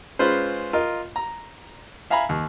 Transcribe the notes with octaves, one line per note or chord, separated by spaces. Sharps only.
G#3 C#4 F4 B4 C5
F4 A#4 D#5
A#5
E5 F5 G#5 A#5 B5
D#2